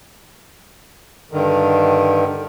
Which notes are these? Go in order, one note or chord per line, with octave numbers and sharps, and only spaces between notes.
G2 D3 D#3